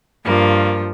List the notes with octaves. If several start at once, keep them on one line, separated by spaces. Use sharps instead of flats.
G2 F3 A#3